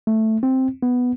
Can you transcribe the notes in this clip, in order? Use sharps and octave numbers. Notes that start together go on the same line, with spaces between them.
A3
C4
B3